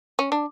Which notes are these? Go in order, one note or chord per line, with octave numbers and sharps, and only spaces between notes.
C#4
D4